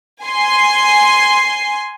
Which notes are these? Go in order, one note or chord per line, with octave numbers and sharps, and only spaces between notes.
G#5 C6